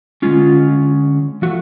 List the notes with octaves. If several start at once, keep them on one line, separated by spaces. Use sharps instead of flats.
D3 G#3 C#4 F4
F3 A3 F#4